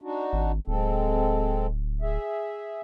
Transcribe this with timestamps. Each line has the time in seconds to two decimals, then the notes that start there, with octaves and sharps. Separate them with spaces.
0.02 D4 D#4 F#4
0.33 G#1
0.67 D1 G#3 C4 A4
2.02 G#4 E5